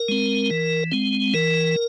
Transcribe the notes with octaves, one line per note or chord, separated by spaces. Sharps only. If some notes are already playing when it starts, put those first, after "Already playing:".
Already playing: A#4
G#3 C4
E3
G#3 C4
E3 A#4